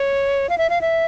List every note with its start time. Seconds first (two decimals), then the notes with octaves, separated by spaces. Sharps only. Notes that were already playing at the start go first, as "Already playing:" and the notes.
Already playing: C#5
0.49 F5
0.58 E5
0.70 F5
0.81 E5